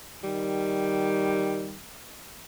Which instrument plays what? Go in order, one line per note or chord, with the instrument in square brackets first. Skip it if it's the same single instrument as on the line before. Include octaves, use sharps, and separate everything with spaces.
[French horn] D#3 [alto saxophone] G3